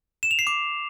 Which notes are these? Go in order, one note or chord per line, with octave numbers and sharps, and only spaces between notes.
E7
F7
C7
D6